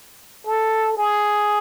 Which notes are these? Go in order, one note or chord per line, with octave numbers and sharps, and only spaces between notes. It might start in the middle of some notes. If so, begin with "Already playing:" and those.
A4
G#4